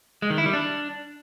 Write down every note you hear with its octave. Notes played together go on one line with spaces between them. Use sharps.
G#3
D#3
E4
G3
D4